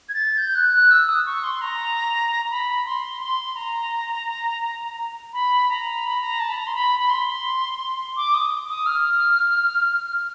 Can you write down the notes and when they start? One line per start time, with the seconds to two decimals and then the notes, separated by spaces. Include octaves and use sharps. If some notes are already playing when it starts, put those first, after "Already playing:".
0.09 G#6
0.14 A6
0.38 G6
0.55 F#6
0.73 F#6
0.91 E6
1.08 D#6
1.26 C#6
1.44 C6
1.61 A#5
2.51 B5
2.86 C6
3.21 C6
3.56 A#5
5.33 B5
5.69 A#5
6.04 B5
6.21 A#5
6.40 A5
6.49 B5
6.57 A#5
6.67 C6
6.75 B5
6.99 B5
7.10 C6
8.16 D6
8.34 D#6
8.69 D#6
8.86 F6